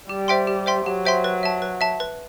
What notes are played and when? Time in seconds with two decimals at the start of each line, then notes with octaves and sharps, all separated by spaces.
0.09 G3 G4
0.28 C5 E5 G5 C6
0.47 G4
0.66 C5 E5 G5 C6
0.86 F#3 G4
1.05 C5 E5 G5 C6
1.24 B4
1.43 E5 A5
1.62 B4
1.81 E5 A5
2.00 B4